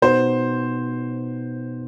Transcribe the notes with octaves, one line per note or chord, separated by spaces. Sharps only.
B2 B3 D#4 C5